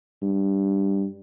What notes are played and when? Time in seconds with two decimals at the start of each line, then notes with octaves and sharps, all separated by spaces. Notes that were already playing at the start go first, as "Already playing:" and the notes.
0.22 G2